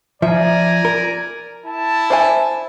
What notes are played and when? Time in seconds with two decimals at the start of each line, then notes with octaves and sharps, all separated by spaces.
0.22 F3 D5 E5 G#5 A#5
0.85 A#4
1.66 E4 A5
2.10 C5 E5 G#5